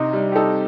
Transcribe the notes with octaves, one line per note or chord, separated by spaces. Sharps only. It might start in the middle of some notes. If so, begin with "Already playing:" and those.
Already playing: C3 D#4
G3
G4
D#4 A4